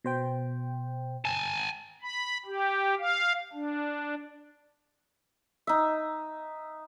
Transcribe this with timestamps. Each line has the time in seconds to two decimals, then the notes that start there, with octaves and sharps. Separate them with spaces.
0.04 B2 C5 G5
1.25 G#5 A5
2.02 B5
2.46 G4
2.99 F5
3.53 D4
5.67 D#4 E5